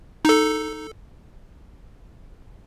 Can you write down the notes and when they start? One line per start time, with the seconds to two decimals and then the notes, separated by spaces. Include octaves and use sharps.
0.25 D#4 A4